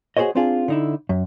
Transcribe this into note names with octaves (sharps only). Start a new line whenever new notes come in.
F#4 G#4 A4 C5 C#5 D#5
C4 D4 F4 G#4
D3 D#4 E4
F#2